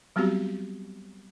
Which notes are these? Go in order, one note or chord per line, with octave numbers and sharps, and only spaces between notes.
F#3 G3 B3 C4 F#4 G4